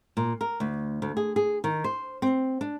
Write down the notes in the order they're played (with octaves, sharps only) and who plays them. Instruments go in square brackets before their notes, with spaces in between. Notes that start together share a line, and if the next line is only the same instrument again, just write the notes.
[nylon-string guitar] A#2
A#4
D2
D2
G#4
G#4
D#3
C5
C4
D4